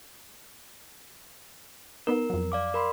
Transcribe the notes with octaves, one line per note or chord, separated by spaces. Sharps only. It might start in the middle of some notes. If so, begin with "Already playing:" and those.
B3 D#4 A#4
F2 F#3
D5 F5 D6
A#4 B5 C6